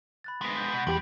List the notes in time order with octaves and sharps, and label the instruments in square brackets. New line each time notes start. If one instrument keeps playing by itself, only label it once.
[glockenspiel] B5 F#6 A6
[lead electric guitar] G#3 B3 [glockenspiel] A#6 B6 D7
[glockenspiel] G6 B6
[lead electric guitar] B2
[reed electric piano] E2 G4 [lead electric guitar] F3 G3 [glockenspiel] D7